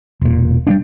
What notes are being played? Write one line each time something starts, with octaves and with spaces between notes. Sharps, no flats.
E1 A#2
G3 B3 D4